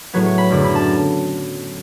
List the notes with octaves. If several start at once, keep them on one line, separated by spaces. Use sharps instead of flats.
A2 F#3 B3 C#5
C#5
B5
F#2 D3 A3
B5
A5